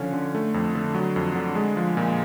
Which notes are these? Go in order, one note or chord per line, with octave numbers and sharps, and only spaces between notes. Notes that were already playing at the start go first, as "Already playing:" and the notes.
Already playing: D3 F3 C#4
D3
A3
F2
D3
F#3
F2
D3
G#3
F3
A#2